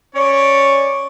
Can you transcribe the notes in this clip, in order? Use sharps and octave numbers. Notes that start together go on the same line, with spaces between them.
C#4 C#5 D5